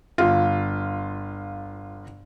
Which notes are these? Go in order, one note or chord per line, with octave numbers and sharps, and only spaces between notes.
G1 F4